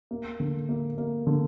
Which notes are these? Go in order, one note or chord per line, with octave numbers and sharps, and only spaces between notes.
A#3
D3
A#3
A#3
D3